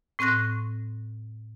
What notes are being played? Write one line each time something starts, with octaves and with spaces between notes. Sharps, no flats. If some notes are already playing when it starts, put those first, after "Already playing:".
A2 C4 C#6 F#6 A#6